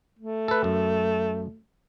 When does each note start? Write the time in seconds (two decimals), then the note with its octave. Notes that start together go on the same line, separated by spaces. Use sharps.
0.19 A3
0.48 A4 B4
0.64 F#2